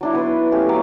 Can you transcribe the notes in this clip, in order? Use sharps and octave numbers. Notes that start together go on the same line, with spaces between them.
F#3 D4 E4
B3 B4 C6
A3 C#4 G4 F5
F#3 A#3 D6